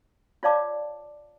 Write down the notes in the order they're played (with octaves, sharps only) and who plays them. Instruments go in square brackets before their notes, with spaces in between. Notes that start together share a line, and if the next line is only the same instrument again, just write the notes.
[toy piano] F4 C#5 D5 F5 A5 D6